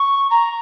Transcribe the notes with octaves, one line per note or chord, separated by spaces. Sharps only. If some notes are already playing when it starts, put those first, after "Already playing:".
Already playing: C#6
A#5